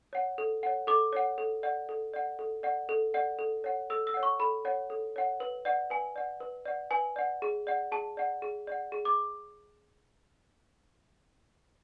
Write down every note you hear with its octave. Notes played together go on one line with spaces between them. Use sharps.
C#5 F#5
A4
C#5 F#5
A4 D6
C#5 F#5
A4
D5 F#5
A4
D5 F#5
A4
D5 F#5
A4
D5 F#5
A4
C#5 F#5
A4 E6
E6
C#5 F#5
C#6
A4 B5
C#5 F#5
A4
C#5 F#5
B4
D5 F#5
B4 G#5
D5 F#5
B4
D5 F#5
B4 G#5
D5 F#5
G#4
D5 F#5
G#4 A5
D5 F#5
G#4
D5 F#5
G#4
D6